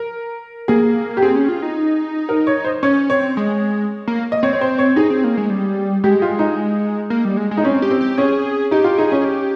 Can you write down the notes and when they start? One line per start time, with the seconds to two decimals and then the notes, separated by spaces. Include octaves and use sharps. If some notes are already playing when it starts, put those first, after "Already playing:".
Already playing: A#4
0.68 A#3 G#4
1.17 G4
1.22 C4 G#4
1.36 C#4
1.49 F4
1.62 D#4
2.29 A#4
2.47 C#5
2.65 C5
2.83 C#4 C#5
3.09 C4 C#5
3.37 G#3
4.08 A#3
4.32 D#5
4.43 C4 C#5
4.53 C#5
4.61 C5
4.78 C#5
4.96 D#4 G#4
5.10 C4
5.24 A#3
5.37 G#3
5.50 G3
6.04 G#3 G4
6.22 F4
6.39 D#4
7.10 A#3
7.25 G3
7.37 G#3
7.51 G#3
7.57 D#4
7.64 C4 C#4
7.82 G4
7.91 C4
8.01 G4
8.18 C#4 G#4
8.71 D#4 G4
8.84 F4
8.98 D#4 G#4
9.12 C#4
9.25 G4